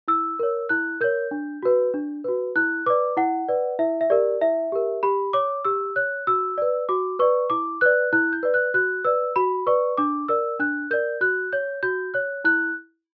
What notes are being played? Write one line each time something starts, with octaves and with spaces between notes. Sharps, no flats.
E4 E6
A#4 C#5
E4 F#6
A#4 C#5 G6
D4
F#4 B4
D4
F#4 B4
E4 F#6
B4 D5 D6
E4 F#5
B4 D5
E4 E5
E5
G4 A#4 D5
E4 E5
G4 A#4
G4 B5
C#5 D6
G4 E6
C#5 F#6
F#4 E6
B4 D5
F#4 D6
B4 D5 C#6
E4 D6
B4 D5 F#6
E4 F#6
G6
B4 D5
F#6
F#4 F#6
B4 D5 E6
F#4 B5
B4 D5 C#6
D4 D6
A#4 D5 E6
D4 F#6
A#4 D5 G6
F#4 F#6
C#5 G6
F#4 G6
C#5 F#6
E4 F#6